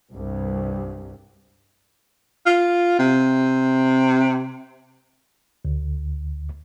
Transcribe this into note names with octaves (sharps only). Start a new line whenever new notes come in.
C2 G2
F4
C3
D2